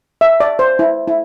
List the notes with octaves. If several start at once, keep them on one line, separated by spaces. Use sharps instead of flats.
E5
D5
C5
E4
E4